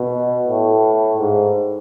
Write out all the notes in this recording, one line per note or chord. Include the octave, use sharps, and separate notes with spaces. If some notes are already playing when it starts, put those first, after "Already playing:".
Already playing: B2
A2
G#2